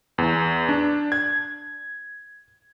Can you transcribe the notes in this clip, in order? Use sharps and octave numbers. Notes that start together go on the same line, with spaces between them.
E2
D4
G#6